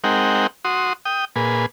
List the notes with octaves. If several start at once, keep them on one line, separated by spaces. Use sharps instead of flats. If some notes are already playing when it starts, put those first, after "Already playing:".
G#3 C4 D#4 A#4 F#5 G5
F#4 C6 D#6
G5 D#6
A#2 G#4 B4